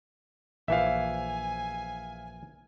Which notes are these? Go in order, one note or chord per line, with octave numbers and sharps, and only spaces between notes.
A#1 E3 F3 E5 F5 G#5